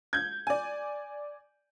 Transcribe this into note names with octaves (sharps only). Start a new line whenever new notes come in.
G6 G#6
D5 G#5